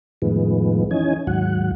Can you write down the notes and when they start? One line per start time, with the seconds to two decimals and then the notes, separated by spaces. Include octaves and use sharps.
0.22 F2 A2 D#3 F3 G#3 B3
0.91 E3 C#4 D#4 G#5
1.27 D#2 G#2 F#3 F#5